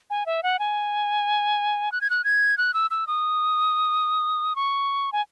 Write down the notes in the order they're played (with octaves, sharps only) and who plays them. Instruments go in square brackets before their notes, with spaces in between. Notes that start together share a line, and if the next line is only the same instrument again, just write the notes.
[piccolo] G#5
E5
F#5
G#5
F#6
G#6
F#6
G#6
F#6
E6
E6
D#6
C#6
G#5